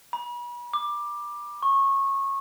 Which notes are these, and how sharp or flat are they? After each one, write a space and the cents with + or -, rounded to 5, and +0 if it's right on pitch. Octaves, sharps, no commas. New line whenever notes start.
B5 -40
D6 +10
C#6 -20